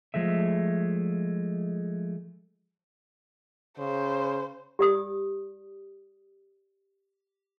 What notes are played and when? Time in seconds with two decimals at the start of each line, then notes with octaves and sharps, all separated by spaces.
0.14 F3 G#3 A3 E5
3.79 C#3 C5
4.79 G4 D5 D#6